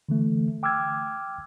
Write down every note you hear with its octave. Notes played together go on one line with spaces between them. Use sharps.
D3 E3 A3
G5 D6 E6 F6 G#6